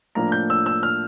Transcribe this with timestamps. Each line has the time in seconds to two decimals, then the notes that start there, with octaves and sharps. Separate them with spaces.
0.15 A2 F3 A#3 D4 A#5
0.32 G6
0.50 E6
0.66 E6
0.83 F6